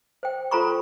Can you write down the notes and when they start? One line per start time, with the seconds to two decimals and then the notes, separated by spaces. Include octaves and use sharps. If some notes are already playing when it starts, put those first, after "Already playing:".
0.23 C5 G5
0.51 F4 A4 C5 A#5 B5 C#6